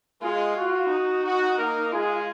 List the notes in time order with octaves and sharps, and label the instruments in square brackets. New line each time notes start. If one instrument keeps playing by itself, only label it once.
[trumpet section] G#3 G#4 [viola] F4
[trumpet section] F#4
[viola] D#4
[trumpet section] F#4
A#3 A#4
[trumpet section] G#3 G#4 [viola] F4